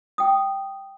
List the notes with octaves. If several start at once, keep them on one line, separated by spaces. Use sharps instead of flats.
G5 D#6